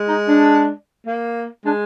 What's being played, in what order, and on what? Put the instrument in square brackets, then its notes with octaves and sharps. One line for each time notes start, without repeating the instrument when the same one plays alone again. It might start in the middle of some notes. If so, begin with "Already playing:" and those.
Already playing: [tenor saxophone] G#3
[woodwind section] D#4
D4
[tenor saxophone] A#3
[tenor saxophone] G#3 [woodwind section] D4